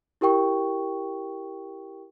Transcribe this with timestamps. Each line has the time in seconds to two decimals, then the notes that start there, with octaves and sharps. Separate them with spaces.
0.21 E4 G4 A#4 G5 C#6